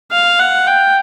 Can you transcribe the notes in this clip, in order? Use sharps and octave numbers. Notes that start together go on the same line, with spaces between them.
F5
F#5
G5